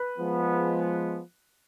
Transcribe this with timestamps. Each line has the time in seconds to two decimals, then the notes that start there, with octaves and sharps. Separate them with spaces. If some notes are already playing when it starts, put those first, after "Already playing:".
Already playing: B4
0.18 F3 G#3 B3